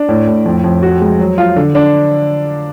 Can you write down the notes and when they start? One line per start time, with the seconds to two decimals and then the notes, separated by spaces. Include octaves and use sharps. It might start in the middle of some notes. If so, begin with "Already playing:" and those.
Already playing: D4
0.09 A2
0.27 A2
0.46 F2
0.64 F2
0.83 F#4
1.01 G#3
1.20 F#3
1.38 F4
1.56 D3
1.75 D4